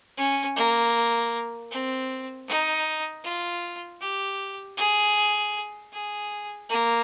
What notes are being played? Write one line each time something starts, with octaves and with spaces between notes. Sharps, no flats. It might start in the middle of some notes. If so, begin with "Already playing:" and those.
C#4
A#3
C4
D#4
F4
G4
G#4
G#4
A#3